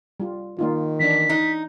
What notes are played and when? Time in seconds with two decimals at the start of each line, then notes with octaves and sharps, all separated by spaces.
0.20 G3 F4
0.59 D#3 A#3 D#4 F4
1.00 E3 D4 B6
1.29 D#4